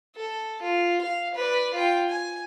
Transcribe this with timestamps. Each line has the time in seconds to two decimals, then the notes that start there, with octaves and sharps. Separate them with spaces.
0.15 A4
0.61 F4
1.01 F5
1.35 B4 D5
1.74 F4 G5
2.09 G#5